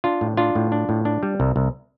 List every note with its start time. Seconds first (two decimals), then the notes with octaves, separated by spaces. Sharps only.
0.04 D4 F4
0.21 A2
0.37 D4 F4
0.55 A2
0.72 D4
0.89 A2
1.05 D4
1.23 G3
1.40 C2
1.56 C2